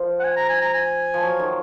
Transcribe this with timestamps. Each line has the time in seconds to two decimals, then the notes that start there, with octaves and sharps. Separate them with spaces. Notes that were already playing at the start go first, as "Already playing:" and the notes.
Already playing: F3
0.20 F#5
0.24 G#5
0.36 A#5
0.49 G#5
0.61 A#5
0.74 G#5
1.14 F3
1.23 F#3
1.40 D#3